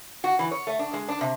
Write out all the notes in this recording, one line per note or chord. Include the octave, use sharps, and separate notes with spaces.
F#4
E3
C#5
A3
D4
G#3
D4
C3